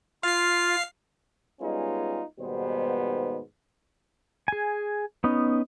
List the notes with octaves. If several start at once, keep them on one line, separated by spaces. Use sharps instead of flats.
F4 F5 C7
G3 G#3 B3 C#4 D#4 F4
D#2 G#2 B2 G3 B3 C5
G#4 G#5
B3 C#4 D#4